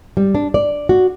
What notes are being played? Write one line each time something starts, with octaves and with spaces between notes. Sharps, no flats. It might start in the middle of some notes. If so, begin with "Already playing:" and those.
G3
D4
D5
F#4